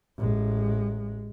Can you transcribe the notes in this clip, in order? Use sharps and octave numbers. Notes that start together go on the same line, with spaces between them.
A1 G#3